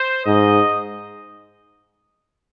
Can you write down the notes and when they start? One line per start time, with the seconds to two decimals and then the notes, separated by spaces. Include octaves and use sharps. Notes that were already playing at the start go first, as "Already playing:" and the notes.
Already playing: C5
0.25 G#2 D#5